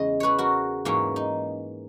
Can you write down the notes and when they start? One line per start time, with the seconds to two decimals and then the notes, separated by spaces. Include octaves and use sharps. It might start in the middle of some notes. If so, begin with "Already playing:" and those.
Already playing: E2 C#3 G#3 D#5
0.20 G#4 B4 C#5
0.39 F#4 A#4
0.85 G#2 E3 A#3 C#4
1.16 D#4